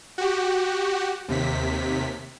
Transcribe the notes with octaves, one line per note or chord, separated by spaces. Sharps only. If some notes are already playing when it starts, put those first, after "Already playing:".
F#4 G4
D#2 C3 B6